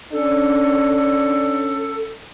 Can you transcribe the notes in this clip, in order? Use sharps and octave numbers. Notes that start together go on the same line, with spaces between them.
C#4 D4 A4